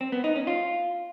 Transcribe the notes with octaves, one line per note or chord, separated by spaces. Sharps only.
C4
B3
D#4
C#4
F4